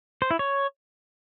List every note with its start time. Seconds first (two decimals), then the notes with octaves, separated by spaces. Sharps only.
0.22 C5
0.31 E4
0.39 C#5